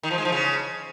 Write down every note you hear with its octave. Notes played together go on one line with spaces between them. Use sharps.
D#3
F3
G#3
F3
C#3